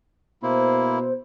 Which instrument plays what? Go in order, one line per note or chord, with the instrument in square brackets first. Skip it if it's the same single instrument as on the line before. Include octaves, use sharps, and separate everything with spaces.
[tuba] B2 [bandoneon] A#3 E4 [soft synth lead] C5